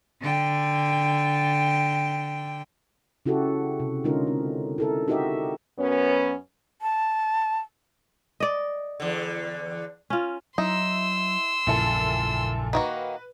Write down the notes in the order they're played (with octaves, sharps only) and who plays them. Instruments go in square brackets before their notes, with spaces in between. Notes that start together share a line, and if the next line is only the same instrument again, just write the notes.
[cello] D3 G5
[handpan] C#3 E4 F#4 G4 A4
C3
D3 G#3 C#4 D#4 F4 A#4
C4
E4 A4 A#4
D#4 F#4 G4 A#4 D#5 E5
[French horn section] F#2 B3 C#4
[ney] A5
[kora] D5 D#5
[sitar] E2 D3
[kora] C#4 F4
[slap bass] F#3 [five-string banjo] D#4 [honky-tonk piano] E4 [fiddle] C6 E6
[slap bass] A#1 F#2 C#3 [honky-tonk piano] A#2 E4 A4
[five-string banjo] D#3 A#3 F#4 [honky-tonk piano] B4